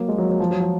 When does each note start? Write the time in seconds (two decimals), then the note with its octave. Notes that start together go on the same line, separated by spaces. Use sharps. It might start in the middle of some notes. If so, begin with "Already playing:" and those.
Already playing: F#3 A#3
0.08 G#3
0.18 F#3
0.29 F#3
0.40 F3
0.51 F#3
0.61 F3